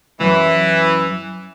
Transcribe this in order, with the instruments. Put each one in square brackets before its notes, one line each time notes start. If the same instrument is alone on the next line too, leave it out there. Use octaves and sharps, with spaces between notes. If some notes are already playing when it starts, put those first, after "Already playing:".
[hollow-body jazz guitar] C#2 F#2 [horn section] E3